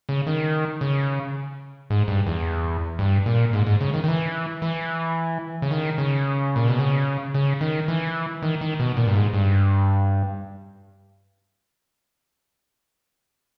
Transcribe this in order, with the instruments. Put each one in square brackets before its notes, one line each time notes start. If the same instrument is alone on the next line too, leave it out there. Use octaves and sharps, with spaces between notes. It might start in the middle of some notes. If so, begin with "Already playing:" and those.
[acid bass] C#3
D#3
C#3
G#2
G2
E2
G2
A#2
G#2
G#2
C#3
D#3
D#3
E3
E3
C#3
D#3
C#3
A#2
B2
C#3
C#3
D#3
E3
D#3
D#3
B2
A#2
G2
G#2
G2